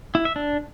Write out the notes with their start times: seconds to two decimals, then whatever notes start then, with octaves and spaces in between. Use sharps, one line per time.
0.15 E4
0.25 E5
0.36 D4